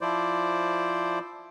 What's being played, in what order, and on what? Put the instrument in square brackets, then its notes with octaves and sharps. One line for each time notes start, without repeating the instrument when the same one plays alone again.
[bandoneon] F3 E4 C5 D5